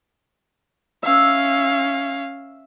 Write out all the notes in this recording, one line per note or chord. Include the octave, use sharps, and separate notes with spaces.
C#4 E5 F5